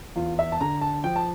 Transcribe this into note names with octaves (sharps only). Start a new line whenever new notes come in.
E2 F4
E5
A5
D3 A#5
A5
F3 G5
A5